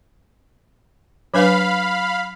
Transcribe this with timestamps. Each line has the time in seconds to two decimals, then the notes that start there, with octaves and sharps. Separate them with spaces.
1.34 F#3 D4 B4 F5 B5